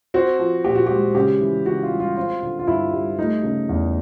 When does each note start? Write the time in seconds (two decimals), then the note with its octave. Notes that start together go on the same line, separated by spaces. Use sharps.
0.14 C4 F#4
0.39 F3
0.64 A#2 G4
0.75 F#4
0.86 G#3 G4
1.15 C#3 G4
1.41 E3
1.66 C#3 F#4
1.83 F4
1.91 G3
2.00 F4
2.16 C4 F4
2.42 D3
2.59 F4
2.67 G2 E4
2.93 G3
3.18 A3 D#4
3.43 C#3
3.69 E2